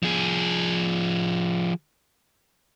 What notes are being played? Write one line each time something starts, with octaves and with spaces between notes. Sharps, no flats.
F3 G#4